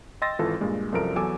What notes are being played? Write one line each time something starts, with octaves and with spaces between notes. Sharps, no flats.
D#5 G5 C6 E6 A6 A#6
G#1 E3 F4 A4
G2 A#2 G#3
C2 F#2 F3 A4 A#4 D7
E2 F#3 A4 G#5 D6 E6